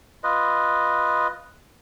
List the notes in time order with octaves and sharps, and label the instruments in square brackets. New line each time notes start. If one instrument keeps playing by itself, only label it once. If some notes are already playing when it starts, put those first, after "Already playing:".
[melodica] F4 B4 D#5